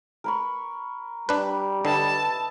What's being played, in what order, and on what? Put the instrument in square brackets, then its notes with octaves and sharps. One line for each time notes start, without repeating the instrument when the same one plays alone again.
[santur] A#4 B5 C#6
[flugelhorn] G3 [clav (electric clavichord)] D4 B4
[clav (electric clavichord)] D3 [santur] B4 D#5 E5 [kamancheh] A5